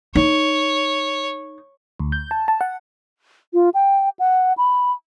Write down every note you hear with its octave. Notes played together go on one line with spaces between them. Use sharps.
D#4 C#5
D2
G6
A5
A5
F#5
F4
G5
F#5
B5